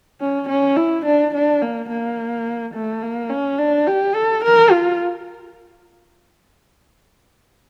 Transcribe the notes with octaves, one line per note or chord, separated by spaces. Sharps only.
C#4
C#4
E4
D4
D4
A#3
A#3
A3
A#3
C#4
D4
G4
A4
A#4
F4